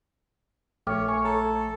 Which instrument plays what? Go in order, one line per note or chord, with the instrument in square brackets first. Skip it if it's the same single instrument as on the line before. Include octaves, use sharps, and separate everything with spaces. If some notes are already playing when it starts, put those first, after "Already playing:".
[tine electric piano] A#1 A3 [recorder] C#5 [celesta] G5 D6 F6
[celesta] G#5 C#6
[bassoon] A4 [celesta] A#5